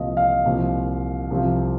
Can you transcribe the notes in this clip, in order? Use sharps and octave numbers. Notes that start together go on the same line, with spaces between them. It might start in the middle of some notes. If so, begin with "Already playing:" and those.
Already playing: C2 A#2 F3 D#5 F5
F5
C2 A#2 F3
C2 C3 F3